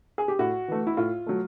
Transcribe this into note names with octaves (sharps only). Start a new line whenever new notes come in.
G#4
G4
A2 F#4
E3 A3
E4
A2 F4
F#3 A3